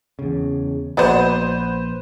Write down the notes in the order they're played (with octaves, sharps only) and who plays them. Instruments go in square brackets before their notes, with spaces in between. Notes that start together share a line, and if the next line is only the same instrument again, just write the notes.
[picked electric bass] E2 C#3
[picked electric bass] A#1 [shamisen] B3 F#4 D5 [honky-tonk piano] B4 C5